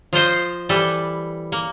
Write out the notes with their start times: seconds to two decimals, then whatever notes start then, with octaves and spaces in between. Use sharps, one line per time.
0.13 F3 F4 C5 D#5
0.69 E3 G3 A4 B4
1.52 A#3